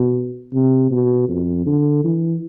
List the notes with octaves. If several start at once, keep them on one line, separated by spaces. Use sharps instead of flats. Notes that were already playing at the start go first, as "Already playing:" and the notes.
Already playing: B2
C3
B2
F2
D3
E3